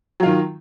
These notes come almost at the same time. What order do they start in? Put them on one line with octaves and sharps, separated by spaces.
F#3 F4 D#3